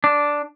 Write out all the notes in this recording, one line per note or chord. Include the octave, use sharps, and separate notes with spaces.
D4